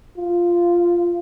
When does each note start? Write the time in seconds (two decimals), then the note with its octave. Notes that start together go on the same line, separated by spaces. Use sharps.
0.17 F4